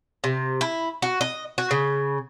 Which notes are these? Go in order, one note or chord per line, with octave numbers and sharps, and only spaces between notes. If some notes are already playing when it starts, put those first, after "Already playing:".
C3
E4
F#4
D#5
F#4
C#3